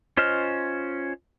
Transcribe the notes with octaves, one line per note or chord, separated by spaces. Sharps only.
C#4 F4 C5 D#5 F6